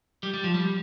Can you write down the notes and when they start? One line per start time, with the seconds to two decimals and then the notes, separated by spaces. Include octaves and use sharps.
0.23 G3
0.34 G3
0.44 F3
0.54 G3